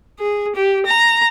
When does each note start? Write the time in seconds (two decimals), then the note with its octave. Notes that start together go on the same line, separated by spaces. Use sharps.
0.19 G#4
0.55 G4
0.85 A#5